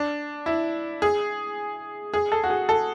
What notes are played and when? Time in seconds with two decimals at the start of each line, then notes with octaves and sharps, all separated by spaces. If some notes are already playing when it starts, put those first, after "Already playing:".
Already playing: D4
0.46 E4
1.02 G#4
2.14 G#4
2.32 A4
2.44 F#4
2.50 G#4
2.69 A4